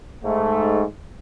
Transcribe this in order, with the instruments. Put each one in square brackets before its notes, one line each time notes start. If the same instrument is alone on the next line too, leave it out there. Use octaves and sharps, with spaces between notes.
[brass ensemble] G#2 A3